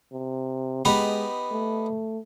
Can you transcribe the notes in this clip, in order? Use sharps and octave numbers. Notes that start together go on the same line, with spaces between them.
C3
G#3 B3 D#4 G4
A3